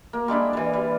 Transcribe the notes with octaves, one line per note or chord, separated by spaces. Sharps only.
A#3
G3 G#3 D4 E4
E3 G3
G3